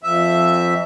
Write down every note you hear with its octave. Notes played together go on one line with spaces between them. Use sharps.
F2 E5